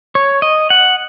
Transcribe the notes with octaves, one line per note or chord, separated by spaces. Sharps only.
C#5
D#5
F#5